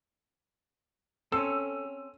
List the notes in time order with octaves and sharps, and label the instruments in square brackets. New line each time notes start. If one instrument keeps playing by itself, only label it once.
[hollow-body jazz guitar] C4 C#4 [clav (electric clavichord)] A4 [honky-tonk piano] E6